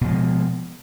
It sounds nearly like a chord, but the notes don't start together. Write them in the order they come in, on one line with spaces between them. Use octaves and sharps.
B2 F3 G#3